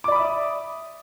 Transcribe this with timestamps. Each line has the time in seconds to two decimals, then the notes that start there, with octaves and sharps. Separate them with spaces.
0.04 D6
0.08 D5
0.12 B5
0.16 D#6
0.19 E5